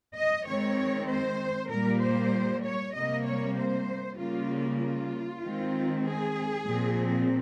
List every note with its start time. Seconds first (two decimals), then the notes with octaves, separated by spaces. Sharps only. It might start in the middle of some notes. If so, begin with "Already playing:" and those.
0.16 D#5
0.47 D#3 G#3 C4 C#5
1.09 C5
1.70 A#2 G3 A#3 A#4
2.01 C5
2.64 C#5
2.94 C3 G3 A#3 D#5
3.26 C#5
3.56 C5
4.18 C#3 G3 A#3 F4
4.80 F4
5.42 D#3 G#3 C4
6.04 G#4
6.65 A#2 F3 C4